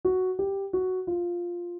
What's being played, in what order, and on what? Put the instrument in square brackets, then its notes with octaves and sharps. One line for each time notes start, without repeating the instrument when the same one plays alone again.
[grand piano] F#4
G4
F#4
F4